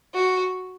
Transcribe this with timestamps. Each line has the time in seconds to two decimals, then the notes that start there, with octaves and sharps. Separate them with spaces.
0.14 F#4